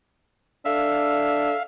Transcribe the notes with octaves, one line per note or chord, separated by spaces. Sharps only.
D4 A4 E5 F5